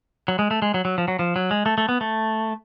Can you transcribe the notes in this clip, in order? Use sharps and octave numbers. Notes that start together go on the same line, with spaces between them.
F#3
G#3
A3
G#3
F#3
F#3
F3
F#3
F3
F#3
G#3
A3
A3
B3
A3